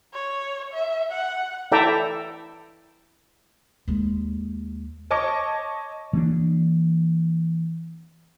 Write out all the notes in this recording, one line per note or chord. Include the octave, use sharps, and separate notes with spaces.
C#5
E5
F#5
E4 A4 D5 E5 G5 A#5
D#2 G#3
C#5 D#5 A5 C#6 D6
E3 A#3 B3 D4